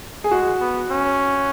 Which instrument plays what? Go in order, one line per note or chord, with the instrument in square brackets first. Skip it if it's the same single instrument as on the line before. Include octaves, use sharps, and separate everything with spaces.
[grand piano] G#4
[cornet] G#3 [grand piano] F#4
[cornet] B3
C#4